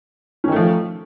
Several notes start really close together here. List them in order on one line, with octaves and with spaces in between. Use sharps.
C#4 D#3 A3 F3